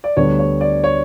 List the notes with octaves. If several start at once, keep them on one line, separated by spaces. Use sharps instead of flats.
D5
D2 D3 G3 B3 C#5
C#5
D5
C#5